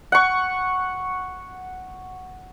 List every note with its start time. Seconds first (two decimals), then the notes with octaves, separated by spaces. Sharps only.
0.12 F#5 C#6